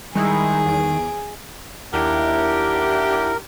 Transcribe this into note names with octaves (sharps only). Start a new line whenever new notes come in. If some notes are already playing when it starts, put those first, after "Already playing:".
D#3 G3 G#3 D#4 E4 G#4
E2 D7
D#2 D4 E4 G4 A#4 F#5